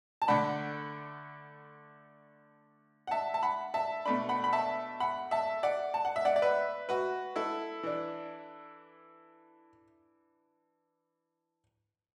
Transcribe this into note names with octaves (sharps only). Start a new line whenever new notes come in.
A5
D3 A3 D4 F#5 B5
F#5
E5 A5
A5
F#5 B5
E5 A5
B2 A3 D4 B5
F#5 B5
B5
E5 A5
F#5 B5
E5 A5
D5 F#5
A5
F#5
E5
D5 F#5
D5
B4 E5
F#4 B4
E4 A4
E3 D4